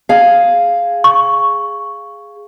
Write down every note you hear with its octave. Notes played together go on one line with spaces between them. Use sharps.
G#4 F5
C#6